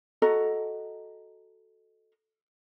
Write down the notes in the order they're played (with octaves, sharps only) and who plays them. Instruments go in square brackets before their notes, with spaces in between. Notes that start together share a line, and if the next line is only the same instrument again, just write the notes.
[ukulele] F#4 A4 D#5 A#5